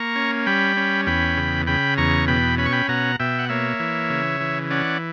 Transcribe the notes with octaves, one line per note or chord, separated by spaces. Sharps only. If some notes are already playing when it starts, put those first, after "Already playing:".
Already playing: A#3 A#5 C#6
C#4
G3 G5 B5
C#4
E2 G5 B5
C#3
C#3 G5 B5
E2 A#5 C#6
B2 G5 B5
C#4 B5
C#6
G5 B5
B2 F#5 A#5
B2 E5 G5
F#5
A#3 C#5 E5
E3
C#3
E3
C#4 D5 F#5